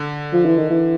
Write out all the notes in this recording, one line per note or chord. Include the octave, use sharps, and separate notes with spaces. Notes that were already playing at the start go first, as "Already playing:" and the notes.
Already playing: D3
F3
E3
D#3
E3